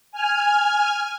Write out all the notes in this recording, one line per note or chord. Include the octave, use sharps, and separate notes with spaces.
G#5 F6